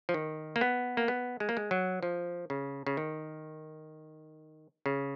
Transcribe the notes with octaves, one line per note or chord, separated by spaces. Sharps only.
F3
D#3
A#3
B3
A#3
B3
G#3
A#3
G#3
F#3
F3
C#3
C#3
D#3
C#3